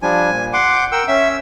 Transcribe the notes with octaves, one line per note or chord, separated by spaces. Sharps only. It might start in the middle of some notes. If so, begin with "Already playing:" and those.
F3 G3 D4 G#5
A#2
F#5 C6 D6
G6
A#4 F#5 G5 E6
C#4 E5 E6